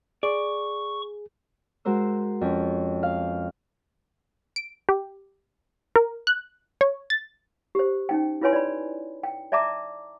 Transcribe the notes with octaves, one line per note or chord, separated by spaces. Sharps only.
G#4 D5 C#6
G#3 F#4 A#4 C5 E6
F2 C#4
F5
D7
G4
A#4
F#6
C#5
A6
G4 C5
C#4 D#4 G5
E4 F4 B4 C#5 G#5 C6
D5 B5
G5
D5 E5 A5 A#5 D6